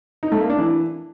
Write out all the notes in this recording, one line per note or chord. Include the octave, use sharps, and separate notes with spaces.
D#4
A3
A#3
D4
E3